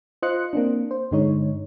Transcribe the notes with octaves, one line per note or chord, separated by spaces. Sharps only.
F4 C5 D#5 C6 F#6 C#7
A#3 C4 D4
C5
G2 D3 G#3 D#4 C#5